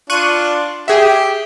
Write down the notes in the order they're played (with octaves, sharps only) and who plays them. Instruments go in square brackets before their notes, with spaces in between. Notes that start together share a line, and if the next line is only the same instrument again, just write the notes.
[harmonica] D4 F4 [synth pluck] C#6 F#6 D#7
[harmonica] G4 [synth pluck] G#4 E5